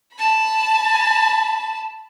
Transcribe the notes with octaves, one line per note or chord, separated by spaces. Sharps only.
A5 B5